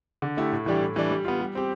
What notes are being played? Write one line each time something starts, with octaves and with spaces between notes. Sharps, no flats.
D3
A3 E4 G4
A2
E3 G3 D4 G4
A2
E3 G3 D4
G3
B3 F4
G3
C4 G4